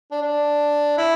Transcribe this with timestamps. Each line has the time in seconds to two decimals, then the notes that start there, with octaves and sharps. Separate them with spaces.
0.11 D4
0.22 D4
0.98 E4